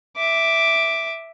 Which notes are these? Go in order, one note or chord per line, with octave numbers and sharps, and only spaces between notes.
E5 D6